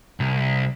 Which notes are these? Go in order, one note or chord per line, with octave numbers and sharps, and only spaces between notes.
C2